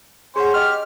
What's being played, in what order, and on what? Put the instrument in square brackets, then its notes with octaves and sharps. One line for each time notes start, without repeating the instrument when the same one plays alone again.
[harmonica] C#4 C5 [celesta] G#4 F#5
[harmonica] G4 F6 [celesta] D#5 C6